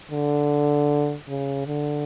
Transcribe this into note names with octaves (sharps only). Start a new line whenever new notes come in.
D3
C#3
D3